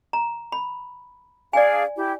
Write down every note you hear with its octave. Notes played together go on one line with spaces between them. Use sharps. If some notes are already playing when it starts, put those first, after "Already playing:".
A#5
B5
D4 G#4 D5 F5 G#5
E4 G4